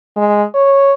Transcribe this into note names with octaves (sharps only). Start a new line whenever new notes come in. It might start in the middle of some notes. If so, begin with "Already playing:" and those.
G#3
C#5